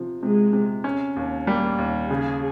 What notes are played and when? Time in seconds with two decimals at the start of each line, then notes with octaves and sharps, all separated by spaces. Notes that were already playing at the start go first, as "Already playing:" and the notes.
Already playing: C3 F3
0.22 C3 G#3
0.53 C3
0.84 C#4
1.16 D#2
1.47 G3 A#3
1.78 D#2
2.10 C#3 G#4